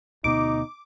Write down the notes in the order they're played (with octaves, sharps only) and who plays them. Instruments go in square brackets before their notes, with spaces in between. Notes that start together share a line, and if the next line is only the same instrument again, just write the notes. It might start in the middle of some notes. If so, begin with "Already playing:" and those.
[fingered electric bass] D2 B2 B3 [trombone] D#4 [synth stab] D6